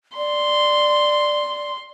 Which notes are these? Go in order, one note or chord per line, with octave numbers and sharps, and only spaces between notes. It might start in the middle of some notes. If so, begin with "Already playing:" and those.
D5 C6